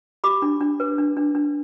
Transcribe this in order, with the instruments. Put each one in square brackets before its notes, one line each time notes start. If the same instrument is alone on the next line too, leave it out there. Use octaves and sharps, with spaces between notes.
[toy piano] G4 B5 D6
D4
D4
B4
D4
D4
D4